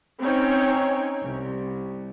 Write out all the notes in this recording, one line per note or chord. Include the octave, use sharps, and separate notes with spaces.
C4 C#4 D#4 C#5 G5
C2